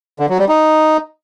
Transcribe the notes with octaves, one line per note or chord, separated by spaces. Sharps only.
D3
F#3
G3
D#4